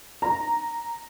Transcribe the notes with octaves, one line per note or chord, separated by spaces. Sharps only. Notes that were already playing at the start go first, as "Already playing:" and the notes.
A#5